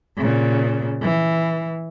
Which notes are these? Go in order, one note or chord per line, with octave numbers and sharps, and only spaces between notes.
A#2 C#3
E3